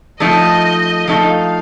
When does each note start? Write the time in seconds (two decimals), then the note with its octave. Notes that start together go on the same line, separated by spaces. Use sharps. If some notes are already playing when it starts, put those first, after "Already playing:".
0.20 F3 A3 D#4 A4 D#5
1.08 F3 A3 D#4 A4 F5